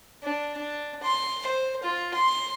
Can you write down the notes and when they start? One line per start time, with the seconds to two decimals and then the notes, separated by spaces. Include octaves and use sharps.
0.23 D4
0.57 D4
1.03 C6
1.46 C5
1.83 F4
2.14 C6